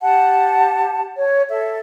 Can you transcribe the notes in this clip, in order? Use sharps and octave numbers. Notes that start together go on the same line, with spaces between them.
G4 F#5 A5
C#5
A4 E5